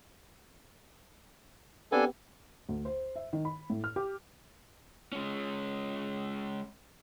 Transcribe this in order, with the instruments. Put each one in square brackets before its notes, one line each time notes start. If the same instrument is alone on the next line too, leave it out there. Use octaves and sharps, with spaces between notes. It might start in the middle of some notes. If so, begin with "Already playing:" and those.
[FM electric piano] B3 C4 G4 [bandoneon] D4 A4 G#5
[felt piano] D2
C5
E5
D#3
B5
A2
F6
G4
[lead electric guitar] G#3 C#4